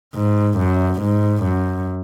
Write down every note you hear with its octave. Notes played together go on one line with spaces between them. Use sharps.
G#2
F#2
G#2
F#2